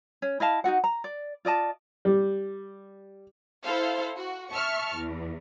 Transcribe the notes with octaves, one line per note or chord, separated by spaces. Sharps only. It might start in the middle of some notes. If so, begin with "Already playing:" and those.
C#4
E4 D#5 F5 A5
D#4 F4 F#4 F#5
A#5
D5
F4 D5 D#5 A5
G3
E4 A4 C5 F5
F#4
E5 A5 C#6 F6
E2